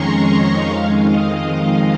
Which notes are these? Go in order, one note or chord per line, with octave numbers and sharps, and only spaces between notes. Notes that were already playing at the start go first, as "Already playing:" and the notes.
Already playing: F2 D#3 G#3 C#4 A#5 C6 C#6
F2 D#3 G#3 F5
D#5